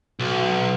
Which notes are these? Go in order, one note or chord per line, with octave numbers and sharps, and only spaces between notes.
B1